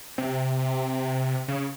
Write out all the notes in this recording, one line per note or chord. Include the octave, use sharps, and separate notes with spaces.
C3
C#3